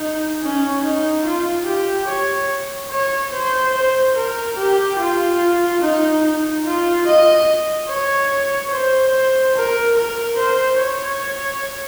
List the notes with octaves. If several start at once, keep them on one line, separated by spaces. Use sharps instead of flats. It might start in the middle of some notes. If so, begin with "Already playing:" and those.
Already playing: D#4
C#4
D#4
F4
G4
C#5
C#5
C5
C5
A#4
G4
F4
D#4
D#4
F4
D#5
C#5
C5
A#4
A#4
C5
C#5